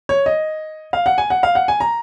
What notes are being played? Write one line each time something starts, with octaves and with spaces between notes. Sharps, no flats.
C#5
D#5
F5
F#5
G#5
F#5
F5
F#5
G#5
A#5